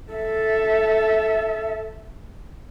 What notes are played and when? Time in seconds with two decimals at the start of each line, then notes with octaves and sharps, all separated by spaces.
0.13 A4 E5